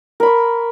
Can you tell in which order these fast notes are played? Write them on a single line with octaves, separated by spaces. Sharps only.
A#4 B5 C#6